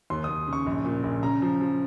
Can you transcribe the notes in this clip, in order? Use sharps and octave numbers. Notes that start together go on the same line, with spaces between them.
D#2 C6
D#2 D#6
C#3
C#6
A#1
A#2
A#1
C#3 A#5
F3
F3